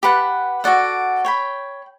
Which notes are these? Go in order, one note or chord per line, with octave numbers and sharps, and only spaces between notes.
G4 B4 F#5 A5
F#4 A4 D5 F#5
C#5 G5 B5